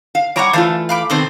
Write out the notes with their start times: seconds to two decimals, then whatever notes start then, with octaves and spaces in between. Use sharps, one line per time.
0.15 F5
0.36 G3 C#5 F#5 A#5 C#6 D6
0.53 E3 A3 F4 C5 F5 A5
0.89 F5 B5 D6
1.10 B2 D#3 C4 A4 C5 C6